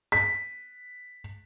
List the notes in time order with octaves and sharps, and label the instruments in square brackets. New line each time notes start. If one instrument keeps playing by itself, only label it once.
[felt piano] B6